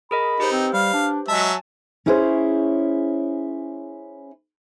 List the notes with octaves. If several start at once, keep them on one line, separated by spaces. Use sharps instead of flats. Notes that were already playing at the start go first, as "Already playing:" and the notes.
G#4 A#4 D#5 B5
D#4 G4 B4 C5
C4
G3 F5
D4
F#3 G#3 E5 G#5 A5
C#4 E4 G#4 A#4 C5 C#5